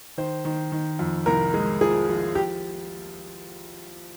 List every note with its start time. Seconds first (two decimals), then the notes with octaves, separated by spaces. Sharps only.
0.18 D#3 C5
0.45 D#3
0.72 D#3
0.99 F2
1.26 C2 A#4
1.54 G#3
1.81 F3 G#4
2.09 F3
2.35 G4